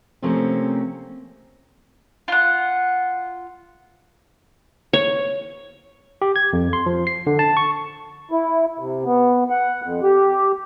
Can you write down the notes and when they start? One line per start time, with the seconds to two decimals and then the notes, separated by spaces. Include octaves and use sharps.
0.22 C3 F3 A3 A#3 C4 C#4
2.28 F4 F#5
4.93 C#5
6.22 G4
6.36 G#6
6.53 F2
6.73 C6
6.86 F3
7.07 C7
7.27 D3
7.39 A5
7.57 C#6
8.31 E4
8.79 C3
9.05 B3
9.50 F#5
9.83 F2
10.03 G4